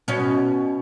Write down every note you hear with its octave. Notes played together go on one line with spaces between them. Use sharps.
B2 C#4